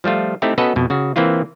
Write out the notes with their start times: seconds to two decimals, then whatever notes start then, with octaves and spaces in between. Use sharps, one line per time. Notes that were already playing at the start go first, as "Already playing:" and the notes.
0.04 F3 G3 A3 F4
0.42 A3 C4 D#4 E4 G4
0.58 B3 C#4 F#4 A4 B4 D#5
0.76 F2 B2
0.90 C#3 F#4
1.16 E3 A#3 C4 E4 F4